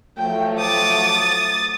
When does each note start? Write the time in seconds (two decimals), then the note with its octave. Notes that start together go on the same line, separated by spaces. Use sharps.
0.18 F3 F#3 A3 G5
0.59 D6 D#6 A6